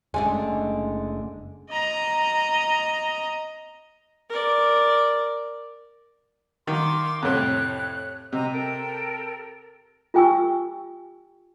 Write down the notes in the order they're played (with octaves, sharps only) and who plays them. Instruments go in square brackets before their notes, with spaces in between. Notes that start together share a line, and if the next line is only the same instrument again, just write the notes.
[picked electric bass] F#1 C#4 [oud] D3 A3 D4 [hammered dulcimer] G#3 [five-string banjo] G#5
[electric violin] D#5 A#5
[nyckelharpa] A#4 D5
[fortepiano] D#3 [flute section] F5 C6 D6
[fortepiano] F2 A2 C3 [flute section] C#5 F#6
[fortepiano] C3 [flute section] D#5 A#5 E6
[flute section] A4 A#4 G5
[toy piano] F4 G4 G5 G#5 C#6 E6